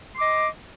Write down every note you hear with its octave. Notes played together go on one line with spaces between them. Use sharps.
D#5 C6 D6